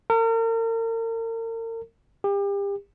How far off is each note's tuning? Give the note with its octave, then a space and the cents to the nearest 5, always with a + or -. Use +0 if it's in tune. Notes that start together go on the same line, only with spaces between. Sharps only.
A#4 -40
G4 +35